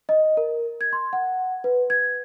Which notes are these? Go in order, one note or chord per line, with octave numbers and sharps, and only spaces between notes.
D#5
A#4
G#6
C6
F#5
B4
G#6